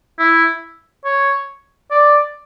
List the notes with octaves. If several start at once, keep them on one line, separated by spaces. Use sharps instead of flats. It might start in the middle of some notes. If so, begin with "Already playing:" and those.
E4
C#5
D5